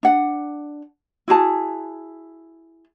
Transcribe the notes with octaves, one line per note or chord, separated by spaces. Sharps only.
D4 F#5
E4 F#4 G#4 A5